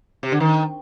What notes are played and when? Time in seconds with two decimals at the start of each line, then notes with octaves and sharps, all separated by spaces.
0.23 C3
0.32 D3
0.40 D#3